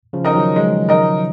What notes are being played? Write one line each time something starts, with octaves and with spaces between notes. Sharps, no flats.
C#3 F3
D#4 A#4 D#5
D#3 F#3
G#3
D#4 A#4 D#5